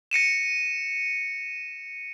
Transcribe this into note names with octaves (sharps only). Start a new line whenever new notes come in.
A#6 C#7 D#7 E7